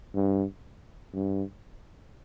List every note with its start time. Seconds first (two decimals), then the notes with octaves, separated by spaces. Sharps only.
0.15 G2
1.13 G2